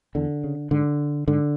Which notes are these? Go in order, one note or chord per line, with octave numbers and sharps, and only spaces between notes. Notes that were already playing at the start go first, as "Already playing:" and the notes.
E2 D3
C#3
G#2 D3
G#2 D3